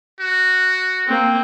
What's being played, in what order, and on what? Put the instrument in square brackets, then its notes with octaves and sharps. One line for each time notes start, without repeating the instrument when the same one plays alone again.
[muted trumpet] F#4
[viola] A#3 C4